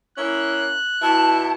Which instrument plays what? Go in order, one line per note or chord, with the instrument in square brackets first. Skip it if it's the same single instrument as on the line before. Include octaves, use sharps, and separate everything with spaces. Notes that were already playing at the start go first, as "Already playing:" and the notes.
[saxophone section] A#3 C#4 E4 [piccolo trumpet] F#6
[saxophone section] B2 E4 [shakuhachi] A5